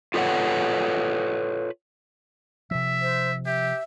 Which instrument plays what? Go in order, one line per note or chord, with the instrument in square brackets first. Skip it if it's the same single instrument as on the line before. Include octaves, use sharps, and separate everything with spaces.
[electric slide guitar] F4 A4 B4 C#5 F#5
[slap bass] C3 F3 [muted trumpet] E5
[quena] C5
[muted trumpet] G4 [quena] E5